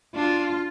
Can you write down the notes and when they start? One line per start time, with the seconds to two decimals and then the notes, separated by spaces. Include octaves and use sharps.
0.15 D4 F4